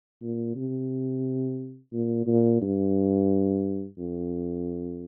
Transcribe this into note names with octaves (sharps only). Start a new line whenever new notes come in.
A#2
C3
A#2
A#2
G2
F2